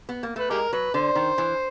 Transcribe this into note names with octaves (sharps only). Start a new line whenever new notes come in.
B3
A#3
A3 B4
G#3 G4 A#4
F#3 B4
D3 C5
D#3
E3